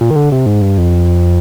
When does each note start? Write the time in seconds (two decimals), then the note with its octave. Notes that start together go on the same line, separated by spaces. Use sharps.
0.01 A#2
0.11 D#3
0.16 D3
0.32 C3
0.46 G#2
0.62 G2
0.78 F2